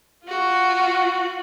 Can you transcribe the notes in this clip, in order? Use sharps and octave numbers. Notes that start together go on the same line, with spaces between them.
F4 F#4